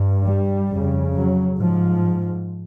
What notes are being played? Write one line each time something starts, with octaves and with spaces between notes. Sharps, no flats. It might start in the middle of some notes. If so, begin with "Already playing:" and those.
Already playing: G2
G3
F2 C#3
F#3
G#2 F3